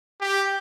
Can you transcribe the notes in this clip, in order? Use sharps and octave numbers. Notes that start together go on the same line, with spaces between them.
G4